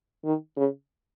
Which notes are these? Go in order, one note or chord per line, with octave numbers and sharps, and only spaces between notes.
D#3
C#3